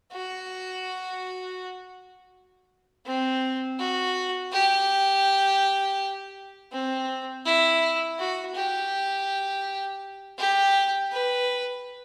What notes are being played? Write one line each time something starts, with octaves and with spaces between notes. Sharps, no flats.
F#4
C4
F#4
G4
C4
E4
F#4
G4
G4
B4